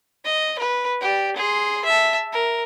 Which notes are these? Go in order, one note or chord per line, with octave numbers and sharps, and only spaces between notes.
D#5
B4
G4 D5
G#4 C6
E5 A5
A#4